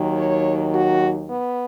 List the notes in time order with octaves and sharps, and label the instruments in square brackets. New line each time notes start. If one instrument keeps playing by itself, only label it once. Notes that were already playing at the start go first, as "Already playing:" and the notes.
Already playing: [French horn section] D#2 D#3 F#3
C#5
F#4
B3